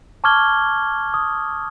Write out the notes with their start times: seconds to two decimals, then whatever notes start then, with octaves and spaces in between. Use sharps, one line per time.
0.24 A5 C#6 D6 F6 G#6 G7
1.14 D#6